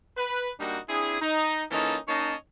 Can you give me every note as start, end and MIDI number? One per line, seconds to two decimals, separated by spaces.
0.17 0.50 71
0.60 0.79 55
0.60 0.79 58
0.60 0.79 62
0.60 0.79 63
0.60 0.79 66
0.89 1.20 60
0.89 1.20 62
0.89 1.20 64
0.89 1.20 68
1.21 1.63 63
1.71 1.97 52
1.71 1.97 58
1.71 1.97 61
1.71 1.97 63
1.71 1.97 65
1.71 1.97 69
2.08 2.35 58
2.08 2.35 61
2.08 2.35 63
2.08 2.35 73
2.08 2.35 75
2.08 2.35 81